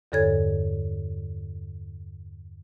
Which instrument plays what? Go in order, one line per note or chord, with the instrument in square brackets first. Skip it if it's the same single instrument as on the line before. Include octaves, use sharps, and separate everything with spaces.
[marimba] E2 G2 D3 A4 C#5 G#6